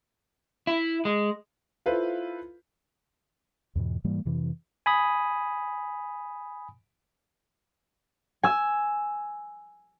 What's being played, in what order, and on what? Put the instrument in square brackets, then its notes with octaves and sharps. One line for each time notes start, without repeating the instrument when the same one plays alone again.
[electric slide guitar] E4
G#3
[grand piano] E4 F4 A4 B4 C5 F5
[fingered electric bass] E2 G#2 B2 E3
G#2 E3 G3 A#3
F2 C3 E3
[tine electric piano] G#5 B5 D#6
[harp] G#5 E6